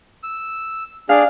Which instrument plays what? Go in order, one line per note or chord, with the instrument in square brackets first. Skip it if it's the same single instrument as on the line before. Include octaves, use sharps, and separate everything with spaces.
[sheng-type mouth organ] E6
[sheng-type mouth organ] D4 G#4 [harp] F5